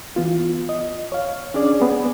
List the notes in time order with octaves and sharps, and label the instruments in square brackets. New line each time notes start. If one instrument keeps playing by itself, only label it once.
[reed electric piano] E3 B3 F4
D#5
C#5 F5
C#4 D4 G#4 D5
B3 C4 G#4